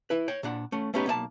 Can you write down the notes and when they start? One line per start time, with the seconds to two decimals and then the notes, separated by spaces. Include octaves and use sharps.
0.10 E4 B4
0.28 C#5 G5
0.43 A#2 D4 F#5
0.72 A3 C#4
0.94 A3 B3 C#4 D#4 G4 B4
1.06 B1 A#3 D#5 A5